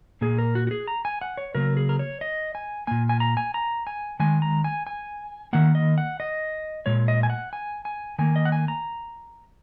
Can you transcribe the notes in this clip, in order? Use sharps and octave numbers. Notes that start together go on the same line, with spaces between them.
A#2 A#3 G#4
A#4
F#4
F#4
G#4
A#5
G#5
F#5
C#5
C#3 F#3 A#3 A#4
G#4
A#4
C#5
D#5
G#5
A#2 A#3 G#5
G#5
A#5
G#5
A#5
G#5
D#3 G#3 G#5
A#5
G#5
G#5
D#3 A#3 F#5
D#5
F#5
D#5
A#2 G#3 C#5
D#5
G#5
F#5
G#5
G#5
D#3 A#3 G#5
D#5
F#5
G#5
A#5